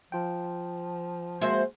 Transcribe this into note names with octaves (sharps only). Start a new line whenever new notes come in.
F3 F4 G5
G#3 A#3 F#4 C5 E5